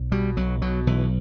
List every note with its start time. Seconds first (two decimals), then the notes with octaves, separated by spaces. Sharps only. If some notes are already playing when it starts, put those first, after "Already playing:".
Already playing: B1
0.12 B2 G3
0.37 B1 F#3
0.62 B2 F#3
0.87 B1 E3